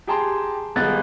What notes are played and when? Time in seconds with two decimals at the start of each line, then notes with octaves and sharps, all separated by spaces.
0.07 G4 G#4 G5 A5 A#5 C6
0.76 D#1 G#3 B3 F#6 A6